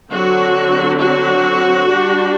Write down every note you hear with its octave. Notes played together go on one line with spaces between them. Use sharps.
D3 F#3 C4 F#4
F#4
G3 D4